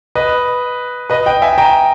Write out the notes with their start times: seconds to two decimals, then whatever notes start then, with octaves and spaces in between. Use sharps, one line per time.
0.15 B4 D#5
1.10 B4 D#5
1.26 D#5 G5
1.42 E5 G#5
1.58 G5 A#5